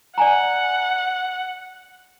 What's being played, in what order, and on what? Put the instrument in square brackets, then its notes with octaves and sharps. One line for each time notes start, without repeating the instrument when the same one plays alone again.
[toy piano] D5 G#5 A#5 [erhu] F#5